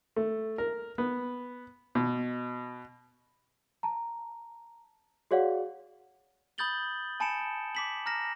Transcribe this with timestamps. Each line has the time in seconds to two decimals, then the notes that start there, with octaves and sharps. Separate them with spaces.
0.16 A3
0.58 A#4
0.98 B3
1.95 B2
3.83 A5 A#5
5.31 F#4 G#4 C#5 D5 F5 F#5
6.58 B5 D#6 G6 A6 F#7 G7
7.20 G#5 A5 B5 C#7 D7 E7
7.75 D6 B6 F#7
8.06 A#5 F6 A#6 E7